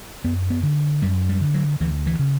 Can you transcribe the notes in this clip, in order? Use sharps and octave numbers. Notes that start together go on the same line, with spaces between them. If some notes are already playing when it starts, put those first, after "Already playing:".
F#2 B3
B3
D3
F#2 G3
G3
D3
F#3
D2 E3
E3
C#3